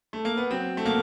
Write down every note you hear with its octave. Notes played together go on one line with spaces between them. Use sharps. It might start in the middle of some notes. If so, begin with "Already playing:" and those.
A3
A#3
B3
F#3 C4
A3
B2 A#3